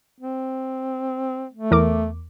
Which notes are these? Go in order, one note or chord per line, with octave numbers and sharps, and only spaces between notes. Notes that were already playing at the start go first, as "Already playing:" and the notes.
C4
A3
E2 A#4 D6